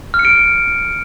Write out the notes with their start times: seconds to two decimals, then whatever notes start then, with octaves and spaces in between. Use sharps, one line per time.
0.14 F6
0.19 C#7
0.25 D7